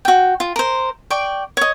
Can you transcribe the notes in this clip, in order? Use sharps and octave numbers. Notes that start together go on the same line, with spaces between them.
F#4 G5
F4
A#4 C5
D5 G5 C#6
C#5 D#5